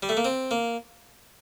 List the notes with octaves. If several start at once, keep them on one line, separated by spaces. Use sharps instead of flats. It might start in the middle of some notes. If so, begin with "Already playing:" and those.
G3
A3
A#3
C4
A#3